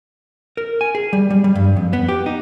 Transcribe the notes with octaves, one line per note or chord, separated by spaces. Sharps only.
A#4
G#5
G#4
G3
G3
G3
G2
F2
B3
G4
D#4